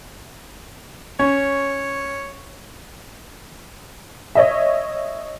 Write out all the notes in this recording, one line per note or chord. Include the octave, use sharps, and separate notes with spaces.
C#4 C#5
C#5 D#5 E5